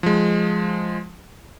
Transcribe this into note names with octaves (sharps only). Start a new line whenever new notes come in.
F3 G#3